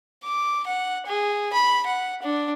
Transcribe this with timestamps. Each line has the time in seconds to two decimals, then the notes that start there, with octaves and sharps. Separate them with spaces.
0.24 D6
0.67 F#5
1.07 G#4
1.53 B5
1.86 F#5
2.22 D4